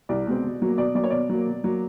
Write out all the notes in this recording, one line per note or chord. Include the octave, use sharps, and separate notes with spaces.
C2 D5
B2 G#3 C4
B2
F#3 A#3
B2 D5
F#3 A#3 D5
C#5
B2 D5
F#3 A#3
B2
F#3 A#3